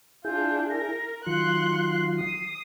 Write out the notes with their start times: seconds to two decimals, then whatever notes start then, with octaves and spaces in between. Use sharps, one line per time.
0.25 D4 E4 F4 G#4 G6
0.70 A#4 A#6
1.26 D#3 F#3 F4 C6 F#6 C#7
1.83 C7
2.19 D#6